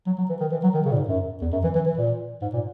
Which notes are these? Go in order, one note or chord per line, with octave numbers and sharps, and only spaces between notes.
F#3
F#3
E3
D#3
E3
F#3
D#3
C#3
A#2
G#2
F#2
E2
F#2
E3
E3
E3
A#2
G#2
A#2